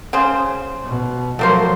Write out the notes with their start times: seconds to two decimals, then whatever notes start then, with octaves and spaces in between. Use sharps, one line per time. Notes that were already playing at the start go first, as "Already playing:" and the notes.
0.13 C#3 G#4 C5
0.84 B2
1.39 F3 F#3 A3 A#3 C5